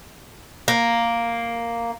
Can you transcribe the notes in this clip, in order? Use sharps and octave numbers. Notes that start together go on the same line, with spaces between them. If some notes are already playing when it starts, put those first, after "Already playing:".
A#3